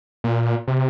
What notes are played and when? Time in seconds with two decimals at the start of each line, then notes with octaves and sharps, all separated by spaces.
0.24 A#2
0.68 C3